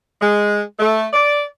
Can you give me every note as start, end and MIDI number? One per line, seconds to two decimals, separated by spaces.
0.20 0.61 56
0.78 1.07 57
1.13 1.43 74